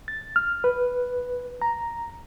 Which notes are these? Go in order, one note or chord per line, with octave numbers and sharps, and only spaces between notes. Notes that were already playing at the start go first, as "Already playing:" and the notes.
A6
F6
B4
A#5